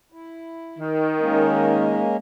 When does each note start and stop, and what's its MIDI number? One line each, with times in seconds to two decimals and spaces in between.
0.12 0.80 64
0.79 2.07 51
1.19 2.17 56
1.19 2.17 58
1.19 2.17 61